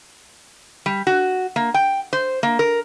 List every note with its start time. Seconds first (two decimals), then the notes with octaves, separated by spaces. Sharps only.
0.86 G3
1.07 F#4
1.56 A#3
1.74 G5
2.13 C5
2.43 A#3
2.59 A#4